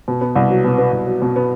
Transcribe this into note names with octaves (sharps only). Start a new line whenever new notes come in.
B2
B3
C2
F#3
B2
B3
C2
F#3
B2
B3